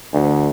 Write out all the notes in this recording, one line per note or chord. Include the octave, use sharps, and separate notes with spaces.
D2